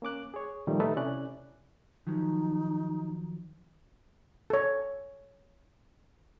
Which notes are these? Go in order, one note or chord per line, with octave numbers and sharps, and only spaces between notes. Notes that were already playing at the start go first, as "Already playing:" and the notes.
A#3 C#4 D6 F#6
G#4 C#5
A#2 D#3 F3 G3 A3
A3 D#4 A4 B4 A5
C3 C#4 E4 D5 F#6
D#3 F3 F#3 D#4
A4 C#5